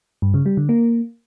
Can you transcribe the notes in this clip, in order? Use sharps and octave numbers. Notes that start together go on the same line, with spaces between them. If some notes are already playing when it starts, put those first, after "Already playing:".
G2
C#3
G3
D3
A#3